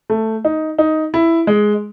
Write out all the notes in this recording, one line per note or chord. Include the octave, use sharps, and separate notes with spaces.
A3
D#4
D#4
E4
G#3